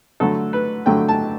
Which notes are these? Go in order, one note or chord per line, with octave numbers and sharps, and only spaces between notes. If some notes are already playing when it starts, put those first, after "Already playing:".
D3 F#3 A3 A4
B4
D3 F#3 A3 G5
A5